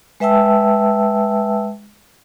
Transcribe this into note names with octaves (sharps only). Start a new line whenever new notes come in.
G#3 B4 E5 G5 A5 E6